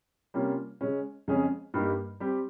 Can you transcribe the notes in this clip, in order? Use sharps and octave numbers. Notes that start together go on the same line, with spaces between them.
C3 G3 A#3 C#4 F4
C#3 G#3 C#4
F2 C#3 G#3 C#4 G#4
G2 G3 A#3 D#4 G4
G3 C4 G4